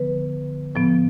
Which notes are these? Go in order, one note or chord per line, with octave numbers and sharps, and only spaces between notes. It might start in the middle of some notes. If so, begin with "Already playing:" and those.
Already playing: D3 F3 B3 B4
A2 F3 B3